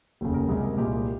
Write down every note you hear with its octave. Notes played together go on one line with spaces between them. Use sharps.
F1 D#2 C#3
A#4
C#2 C3 G3 G#4
A#4
C2 A#2 G#3 G4